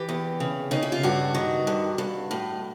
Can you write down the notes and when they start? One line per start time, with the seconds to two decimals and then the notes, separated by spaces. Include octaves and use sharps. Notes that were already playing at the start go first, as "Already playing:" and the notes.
Already playing: E3 G4
0.09 E2
0.40 C#3
0.71 C#3 D#4
0.83 E4
0.92 F4
1.03 G2 F#4
1.35 D#3
1.67 G2
1.98 G2
2.31 A2